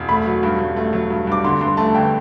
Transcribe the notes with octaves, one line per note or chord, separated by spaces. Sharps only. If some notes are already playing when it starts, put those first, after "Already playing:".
Already playing: E1
A3 B5
F#3
G2
G2
A3
F#3
G2
G2 D6
D3 C6
G2 C6
A3 A5
G1 G5